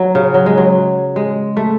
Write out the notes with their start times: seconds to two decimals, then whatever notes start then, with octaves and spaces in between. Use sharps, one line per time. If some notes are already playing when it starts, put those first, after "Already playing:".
Already playing: F#3
0.15 C#3
0.34 F#3
0.46 G#3
0.58 F#3
1.16 G#3
1.57 A3